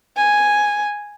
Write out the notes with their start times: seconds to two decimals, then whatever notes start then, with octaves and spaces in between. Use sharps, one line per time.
0.17 G#5